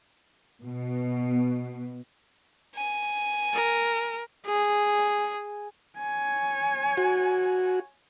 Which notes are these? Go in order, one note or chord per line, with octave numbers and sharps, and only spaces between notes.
B2
G#5
A#4
G#4
C#5 G#5
F#4